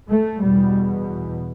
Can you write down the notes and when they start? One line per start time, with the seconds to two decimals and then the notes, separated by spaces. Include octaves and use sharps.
0.09 A3
0.40 E2 B2 G3